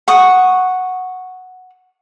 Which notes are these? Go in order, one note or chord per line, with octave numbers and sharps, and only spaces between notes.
F#5 C#6 D#6